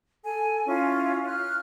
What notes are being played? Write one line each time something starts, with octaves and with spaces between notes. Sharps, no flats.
A4 G#5
C#4 E4 F4
F6 F#6